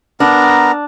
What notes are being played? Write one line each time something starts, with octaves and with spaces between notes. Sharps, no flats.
B3 D4 A#4 A#5